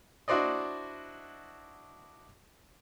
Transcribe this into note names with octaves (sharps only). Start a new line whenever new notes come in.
D4 E4 F#4 C5 D5 D#5